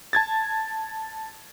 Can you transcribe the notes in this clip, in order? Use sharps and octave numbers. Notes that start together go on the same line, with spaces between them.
A5 G#6 A6